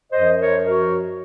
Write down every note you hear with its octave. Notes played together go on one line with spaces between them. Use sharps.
F#2 F3 C5 D#5
A#4 C#5
F#4 A#4